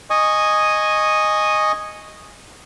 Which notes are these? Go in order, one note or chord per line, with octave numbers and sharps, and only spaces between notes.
D#5 G#5 C#6 D#6